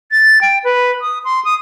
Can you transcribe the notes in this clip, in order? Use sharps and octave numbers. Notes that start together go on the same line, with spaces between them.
A6
G5
B4
D#6
C6
D#6